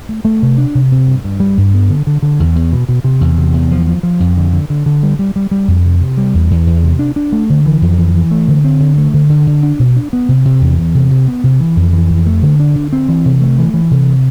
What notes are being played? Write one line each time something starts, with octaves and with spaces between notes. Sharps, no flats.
A3
A3
C3
D4
C3
C3
G2
G2
G3
G2
B3
D3
D3
D3
E2
E2
B2
B2
C3
E2
C3
E2
F3
F3
F3
F2
D3
D3
D3
D3
G3
G3
G3
G3
F2
C3
C3
G3
E2
E2
E2
C3
D4
D4
A3
D3
E3
F2
E3
E3
A3
D3
C4
D3
A3
D3
D3
D3
D4
B2
D4
B3
C3
C3
E2
E2
C3
C3
B3
C3
E3
F2
E3
F2
A3
D3
D4
D3
C4
E3
C3
A3
E3
E3
C3